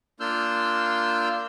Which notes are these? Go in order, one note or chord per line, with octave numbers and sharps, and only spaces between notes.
A#3 D4 F4 E6 F6 G6